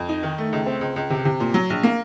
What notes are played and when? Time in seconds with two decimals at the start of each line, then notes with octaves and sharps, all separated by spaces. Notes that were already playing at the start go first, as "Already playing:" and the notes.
Already playing: F2
0.09 D#4
0.23 D#3
0.38 A3
0.53 C#2
0.66 C4
0.81 C#2
0.96 C#2
1.10 C3
1.25 C3
1.40 A#2
1.54 F#3
1.70 A#1
1.83 A#3